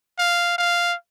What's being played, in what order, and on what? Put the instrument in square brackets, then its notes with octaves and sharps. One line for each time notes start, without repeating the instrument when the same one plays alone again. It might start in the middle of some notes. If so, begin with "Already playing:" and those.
[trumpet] F5
F5